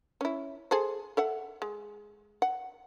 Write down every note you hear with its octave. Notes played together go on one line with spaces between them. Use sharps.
C#4 E4
G#4 A4 C5
A4 E5 F#5
G#3
F#5